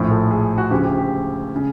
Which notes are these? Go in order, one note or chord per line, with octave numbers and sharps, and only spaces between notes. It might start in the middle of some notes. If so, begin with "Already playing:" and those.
Already playing: A#1 A2 F3
A4
G#4
F#4
D2 C#3 F3 G4
G4
G4
C#3